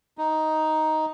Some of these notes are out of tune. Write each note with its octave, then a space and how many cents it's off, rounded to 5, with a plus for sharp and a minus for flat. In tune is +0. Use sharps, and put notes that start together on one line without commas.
D#4 +5